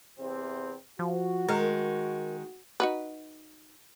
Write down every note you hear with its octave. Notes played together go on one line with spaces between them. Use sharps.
E2 C3 C4
F3 F#4
D#3 G#3 A#4
D#4 F#4 B4